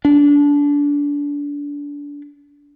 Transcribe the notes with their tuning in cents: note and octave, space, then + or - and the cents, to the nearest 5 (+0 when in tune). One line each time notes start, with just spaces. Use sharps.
D4 -25